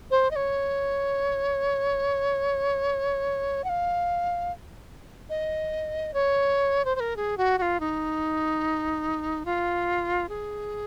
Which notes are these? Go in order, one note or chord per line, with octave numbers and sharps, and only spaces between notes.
C5
D#5
C#5
F#5
F5
D#5
C#5
C5
C5
A#4
G#4
F#4
F#4
F4
D#4
F4
G#4